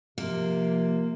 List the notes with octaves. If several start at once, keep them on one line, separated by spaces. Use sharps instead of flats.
C3 F3 A#3